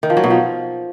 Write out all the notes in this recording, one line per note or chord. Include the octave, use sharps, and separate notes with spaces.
D#3
F3
F#3
B2
F3